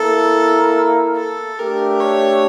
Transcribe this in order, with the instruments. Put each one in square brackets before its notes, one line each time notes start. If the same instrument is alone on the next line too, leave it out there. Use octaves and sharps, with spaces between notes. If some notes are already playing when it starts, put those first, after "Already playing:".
Already playing: [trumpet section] A#3 E4 A#4 [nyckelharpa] A4
[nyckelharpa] A4
[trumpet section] A3 D4 G4 [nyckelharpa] A#4
[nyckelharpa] C#5